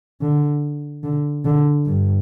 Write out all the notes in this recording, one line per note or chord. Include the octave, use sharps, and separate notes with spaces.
D3
D3
D3
G2